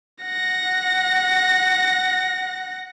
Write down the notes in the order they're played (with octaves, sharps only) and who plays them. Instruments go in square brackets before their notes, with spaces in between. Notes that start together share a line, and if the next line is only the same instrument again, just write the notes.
[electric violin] F#5 A#6